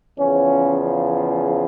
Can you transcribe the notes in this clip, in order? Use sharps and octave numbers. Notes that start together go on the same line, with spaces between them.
E2 C#3 F3 C#4